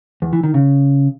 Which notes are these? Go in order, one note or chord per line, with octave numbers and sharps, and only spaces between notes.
E2
E3
D#3
C#3